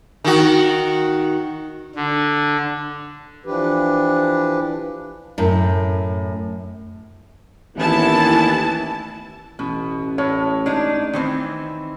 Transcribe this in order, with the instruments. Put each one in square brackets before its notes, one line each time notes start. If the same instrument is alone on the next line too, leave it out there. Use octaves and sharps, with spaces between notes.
[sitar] D#3 F#4
[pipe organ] D3
[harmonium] E3 F3 D4 G4 B4
[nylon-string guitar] F#2 A2
[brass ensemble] A1 D#2 E3 [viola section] B3 E4 A5
[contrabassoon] A1 [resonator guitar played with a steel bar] B2
[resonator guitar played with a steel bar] A2 [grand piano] C#5
[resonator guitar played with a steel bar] G#3 D4 D#4
D#3 E3 C4